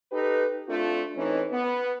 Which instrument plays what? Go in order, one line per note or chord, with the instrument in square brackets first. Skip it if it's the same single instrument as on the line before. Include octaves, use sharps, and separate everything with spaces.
[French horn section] D#4 G4 A4 B4
A3 C4 D4 F4
E3 A3 C4 C#4 D#4
B3